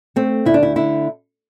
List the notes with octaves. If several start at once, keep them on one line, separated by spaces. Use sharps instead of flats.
A3 C4
D2 E4
D4
E4
D3 E4